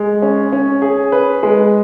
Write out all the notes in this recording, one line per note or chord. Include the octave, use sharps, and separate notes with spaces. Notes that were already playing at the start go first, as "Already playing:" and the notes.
Already playing: G#3
C#4
C#4
G#4
B4
G#3